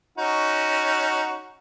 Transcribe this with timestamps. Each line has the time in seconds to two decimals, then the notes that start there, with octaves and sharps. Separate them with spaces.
0.18 C#4 D#4 F#4